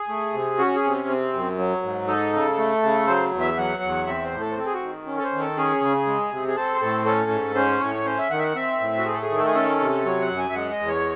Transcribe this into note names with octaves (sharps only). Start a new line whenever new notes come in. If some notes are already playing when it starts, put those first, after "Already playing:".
Already playing: G#4
A3
C3
C#4 F#4
G#4
C3
C4
F#2
F#3
G#2
D#4 A4
C#3
A3
C#3
F#3 C5
E2
E5
F#3 F#5
E2
C4 E5
C5
A2
A4
C5
C4 A4
G#4
F#4
D#3
C#4
A4
C5
D#3
A4
C#4 G#4
C#3
G#3
C3
G#4
C4 A4
C5
A2 A4
C#4 A4
G#2
C#4 C5
A2 C#5
C#4 C5
E5
D#3 F#5
E5
F#5
C4 E5
A2
F#4
A3 G#4
A4
G#4
D#3
A4
G#4
C#4 A4
C3
F#3 C#5
F#5
F#2
G#5
E5
G#3 F#5
D#5
E2
C#5